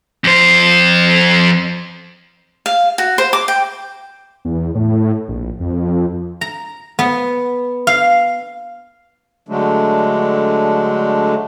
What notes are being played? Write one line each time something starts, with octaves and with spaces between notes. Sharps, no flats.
F2 C5
F5
F#4
C5
D6
G5
E2
A2
A#1
F2
A#5
B3
F5
D3 F#3 G#3 A3 D4